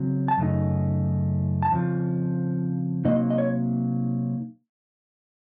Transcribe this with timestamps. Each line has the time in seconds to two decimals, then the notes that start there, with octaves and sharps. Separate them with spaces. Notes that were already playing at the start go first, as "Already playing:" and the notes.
Already playing: C#3 F#3 C4
0.28 A5
0.38 F#2 C#3 A3 D#4
1.63 A5
1.72 F2 C#3 F3
3.05 C3 F#3 A#3 D#4 D#5
3.30 D#5
3.38 C#5